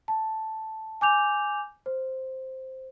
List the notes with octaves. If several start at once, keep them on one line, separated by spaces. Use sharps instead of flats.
A5
G#5 D6 G6 F7
C5